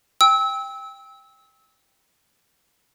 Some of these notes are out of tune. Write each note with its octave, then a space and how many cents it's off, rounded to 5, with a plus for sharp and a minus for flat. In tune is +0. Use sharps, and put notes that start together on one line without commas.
G5 +15 E6 -25